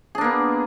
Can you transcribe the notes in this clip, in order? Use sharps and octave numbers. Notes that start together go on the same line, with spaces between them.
A#3 B3 D4 G#4